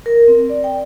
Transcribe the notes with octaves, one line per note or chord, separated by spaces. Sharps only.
A#4
C4
D5
G5